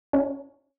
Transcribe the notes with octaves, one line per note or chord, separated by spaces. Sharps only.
C#4